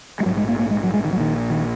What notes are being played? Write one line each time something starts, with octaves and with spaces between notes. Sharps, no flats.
G#3
A#1 G#2 F#3
G#3
A#3
A#3
G#3
F#3
G#3
D#3
F#3
A#1 A#2 D#3
D#3